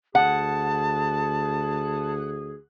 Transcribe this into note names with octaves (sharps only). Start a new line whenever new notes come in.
D2 G#4 F#5 A5